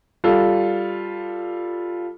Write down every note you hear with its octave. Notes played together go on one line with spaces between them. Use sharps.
G3 F4 A4